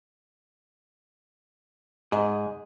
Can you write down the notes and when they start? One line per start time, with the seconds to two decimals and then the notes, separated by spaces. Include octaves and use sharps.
2.12 G#2 G#4 D#5